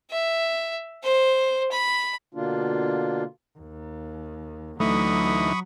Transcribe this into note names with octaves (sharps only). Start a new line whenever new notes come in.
E5
C5
B5
B2 D3 A#3 D4 F4
D#2
D2 E3 F#3 A3 D#4 B5 C#6 D#6